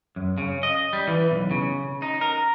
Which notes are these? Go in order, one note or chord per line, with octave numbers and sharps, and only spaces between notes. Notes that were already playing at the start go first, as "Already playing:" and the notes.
F#2
C#3
D#5
G3
E3
B1
C#3
D#4
A#4